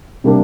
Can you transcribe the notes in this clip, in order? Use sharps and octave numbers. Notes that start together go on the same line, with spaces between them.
C3 G3 A#3 D4